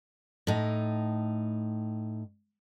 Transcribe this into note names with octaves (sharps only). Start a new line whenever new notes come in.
A2 D#4